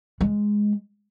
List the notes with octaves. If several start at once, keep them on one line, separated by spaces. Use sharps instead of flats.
G#3